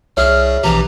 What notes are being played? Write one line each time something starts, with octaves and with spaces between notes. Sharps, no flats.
C2 G#4 C#5 E5 F6
A#1 B2 E3 G4 A#5